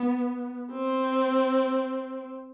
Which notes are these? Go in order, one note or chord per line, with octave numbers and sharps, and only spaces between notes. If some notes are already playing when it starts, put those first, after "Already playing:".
Already playing: B3
C4